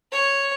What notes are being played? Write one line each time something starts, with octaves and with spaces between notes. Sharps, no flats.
C#5